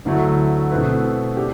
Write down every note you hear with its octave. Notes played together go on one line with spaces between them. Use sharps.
D2 D3 F#3 A3 E4
B2 A3 C4 E4 B4
D4 G4